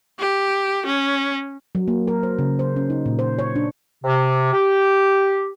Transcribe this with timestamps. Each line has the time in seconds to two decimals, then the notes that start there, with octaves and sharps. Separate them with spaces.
0.20 G4
0.86 C#4
1.75 F#3
1.88 A#3
2.07 A#4
2.23 C5
2.39 C#3
2.59 C5
2.76 C#4
2.90 D#4
3.06 A#2
3.19 C5
3.39 C#5
3.56 D4
4.04 C3
4.52 G4